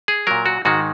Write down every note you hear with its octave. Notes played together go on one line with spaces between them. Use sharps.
G#4
A#2 F#3 A#4
F#4
G#2 D#3 G#3 F#4